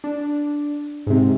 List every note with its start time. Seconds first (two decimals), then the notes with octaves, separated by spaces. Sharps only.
0.04 D4
1.07 G#2 C3